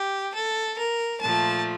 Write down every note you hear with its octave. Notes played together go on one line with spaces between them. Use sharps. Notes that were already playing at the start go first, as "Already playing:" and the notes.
Already playing: G4
A4
A#4
A#2 F3 A3 A5